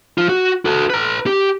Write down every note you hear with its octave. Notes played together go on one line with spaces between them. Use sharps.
F3 F4
F#4
F#4 A4
B4 A#5
G4